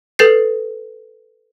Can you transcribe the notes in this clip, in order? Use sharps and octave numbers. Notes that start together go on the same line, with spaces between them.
A4 B4 G6 A6 C7